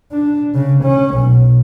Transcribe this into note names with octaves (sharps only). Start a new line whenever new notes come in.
D4
C#3
C#4
B1